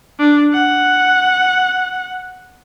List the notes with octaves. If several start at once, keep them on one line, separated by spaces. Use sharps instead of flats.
D4
F#5